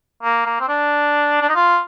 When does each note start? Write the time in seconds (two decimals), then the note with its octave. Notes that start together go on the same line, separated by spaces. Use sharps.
0.23 A#3
0.46 A#3
0.60 C4
0.68 D4
1.41 D4
1.49 D#4
1.55 F4